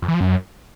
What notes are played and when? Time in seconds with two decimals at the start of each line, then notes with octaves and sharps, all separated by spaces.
0.02 F2
0.08 E3
0.14 F3
0.21 F#2